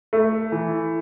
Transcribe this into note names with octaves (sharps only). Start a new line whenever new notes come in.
A3
E3